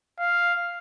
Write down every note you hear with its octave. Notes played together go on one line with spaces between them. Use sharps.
F5